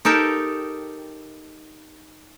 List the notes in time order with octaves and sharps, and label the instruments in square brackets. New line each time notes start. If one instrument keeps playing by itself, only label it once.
[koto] D#4 G4 A4 A#4 G5